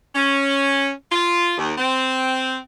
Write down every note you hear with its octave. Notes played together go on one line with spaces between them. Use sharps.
C#4
F4
D#2
C4